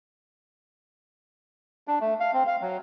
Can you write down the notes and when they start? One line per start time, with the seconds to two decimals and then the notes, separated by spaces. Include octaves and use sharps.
1.88 D4
2.01 A3
2.20 F5
2.34 C4
2.47 F5
2.61 F#3